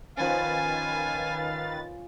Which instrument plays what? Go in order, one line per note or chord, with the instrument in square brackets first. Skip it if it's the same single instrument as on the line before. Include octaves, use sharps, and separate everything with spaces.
[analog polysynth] D#3 B4 A6 [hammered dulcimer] F3 C#4 [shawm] F5 [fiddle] G#5